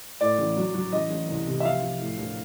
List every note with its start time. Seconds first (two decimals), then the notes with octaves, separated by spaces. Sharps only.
0.21 A2 D5
0.39 A1
0.57 F#3
0.75 F#3
0.93 A1 D#5
1.11 A1
1.29 C2
1.47 C3
1.60 E5
1.65 F3 F5
1.83 F3
2.01 A2
2.18 A#1